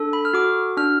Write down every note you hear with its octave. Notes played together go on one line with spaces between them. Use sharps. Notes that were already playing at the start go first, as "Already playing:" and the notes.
Already playing: D4 A4
B5
F6
F#4 D6
D4 F6